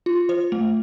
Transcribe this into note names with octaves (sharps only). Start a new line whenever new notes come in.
F4
C5
A3